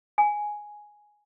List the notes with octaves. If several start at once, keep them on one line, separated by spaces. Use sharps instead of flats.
G#5